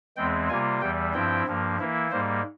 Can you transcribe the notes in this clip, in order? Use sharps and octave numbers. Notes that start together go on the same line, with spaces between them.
E2 E3 G#3 C4 G5
C3 G3 A#3 F4 G#5
E2 E3 G3 G5
G2 F3 C4 E4 G5
G2 F3 A#3
E3 A#3 E4
G#2 G3 A#3 C5